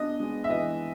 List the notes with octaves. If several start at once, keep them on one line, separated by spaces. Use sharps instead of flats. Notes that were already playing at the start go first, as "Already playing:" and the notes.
Already playing: B3 D4 D#5
G#3
E5
E3 D#5